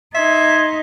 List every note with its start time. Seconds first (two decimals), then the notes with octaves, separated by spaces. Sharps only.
0.15 D#4 E5 C6 G#6